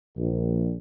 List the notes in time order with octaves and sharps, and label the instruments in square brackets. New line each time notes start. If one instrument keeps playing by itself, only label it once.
[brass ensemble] A#1